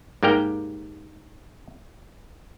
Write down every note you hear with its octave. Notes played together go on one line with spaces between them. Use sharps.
G#2 G3 A#3 G4 A#4 G5